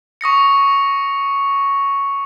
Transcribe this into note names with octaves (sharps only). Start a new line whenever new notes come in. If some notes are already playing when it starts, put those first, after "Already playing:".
C#6 D#6 A#6 C#7